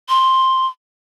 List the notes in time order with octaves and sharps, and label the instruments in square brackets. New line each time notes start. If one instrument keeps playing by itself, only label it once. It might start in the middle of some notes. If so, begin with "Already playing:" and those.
[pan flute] C6